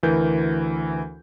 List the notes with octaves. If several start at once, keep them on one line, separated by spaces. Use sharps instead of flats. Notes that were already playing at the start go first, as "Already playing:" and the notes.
D2 E3 A#4 G6